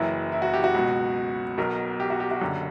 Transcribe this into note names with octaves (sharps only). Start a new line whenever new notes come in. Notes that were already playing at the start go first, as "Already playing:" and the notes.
Already playing: F#1 F#2 E3 E4
E4
F#4
G4
F#4
C#2 B2
B1 B2 A#4
G4
F#4
G4
F#4
F#1 F#2 D3 G4